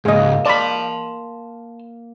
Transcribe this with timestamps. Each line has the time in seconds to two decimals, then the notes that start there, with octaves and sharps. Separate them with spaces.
0.05 C#2 G#2 A#3 G#4 D#5
0.46 D5 A5 B5 C6